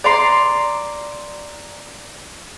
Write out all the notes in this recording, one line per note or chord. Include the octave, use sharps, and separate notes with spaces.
D5 A#5 C6